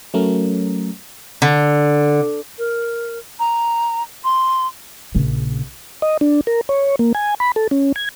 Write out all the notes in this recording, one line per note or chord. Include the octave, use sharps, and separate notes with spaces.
F#3 A3 C#4 A#4
D3
A#4
A#5
C6
A#1 C#3
D#5
D4
A#4
C#5
A#3
G#5
B5
A4
C#4
G#6